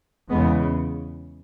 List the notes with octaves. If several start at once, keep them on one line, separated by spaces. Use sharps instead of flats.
E2 C#3 G#3 B3